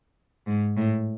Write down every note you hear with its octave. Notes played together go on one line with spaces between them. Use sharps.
G#2
A2